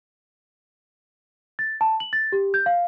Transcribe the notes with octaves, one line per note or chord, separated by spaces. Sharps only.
A6
A5
F#7
A6
G4
G6
F5